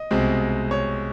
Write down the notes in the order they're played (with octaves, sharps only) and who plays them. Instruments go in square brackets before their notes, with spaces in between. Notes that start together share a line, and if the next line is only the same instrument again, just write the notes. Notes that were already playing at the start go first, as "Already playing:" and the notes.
Already playing: [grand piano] D#5
C2 B2 G#3 C4
C#5